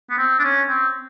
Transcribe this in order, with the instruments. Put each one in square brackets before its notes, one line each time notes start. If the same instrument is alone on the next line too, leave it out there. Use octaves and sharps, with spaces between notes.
[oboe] B3
C4
D4
C#4
C4